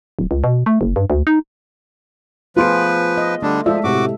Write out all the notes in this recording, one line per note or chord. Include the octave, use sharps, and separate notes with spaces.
D1
C#2
B2
A3
F#1
G2
D2
D#4
F3 A3 B3 F4 G#4 B4 C6 D7
D#5
D3 G3 A3 D4
F3 G#3 F4 A4 D5 E5 E6
A2 C3 F#4 G4 D6